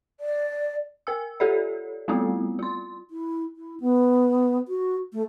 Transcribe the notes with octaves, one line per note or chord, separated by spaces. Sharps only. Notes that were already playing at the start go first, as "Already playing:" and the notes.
D5
A#4 G#5 E6
F4 G4 A4 C#5 D5
G3 A3 B3 C4 E4 F4
F4 C6
E4
E4
B3
F#4
A3